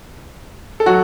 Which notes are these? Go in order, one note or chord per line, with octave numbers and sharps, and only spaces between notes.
A4
F#3 F#4